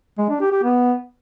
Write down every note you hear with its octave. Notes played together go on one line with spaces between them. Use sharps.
G#3
D4
G4
G4
B3